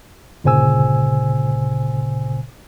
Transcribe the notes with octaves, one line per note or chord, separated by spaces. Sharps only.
G1 A#2 C#3 C5 G#5 E6